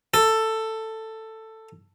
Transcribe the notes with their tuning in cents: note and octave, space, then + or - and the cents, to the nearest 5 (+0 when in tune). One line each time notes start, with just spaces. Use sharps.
A4 +10